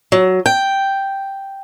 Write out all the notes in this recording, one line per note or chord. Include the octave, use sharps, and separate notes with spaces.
F#3
G5